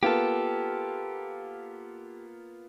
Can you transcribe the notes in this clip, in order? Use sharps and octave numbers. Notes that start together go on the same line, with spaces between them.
A#3 B3 F4 G4 A4